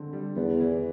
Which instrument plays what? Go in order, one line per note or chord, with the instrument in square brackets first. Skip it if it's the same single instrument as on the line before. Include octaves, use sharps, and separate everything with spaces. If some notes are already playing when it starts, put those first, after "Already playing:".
Already playing: [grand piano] D3 G#3 C4
G3
[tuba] E2 [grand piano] B3
[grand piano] E3